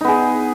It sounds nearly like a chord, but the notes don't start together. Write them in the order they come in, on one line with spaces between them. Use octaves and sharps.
D#4 B3 G#4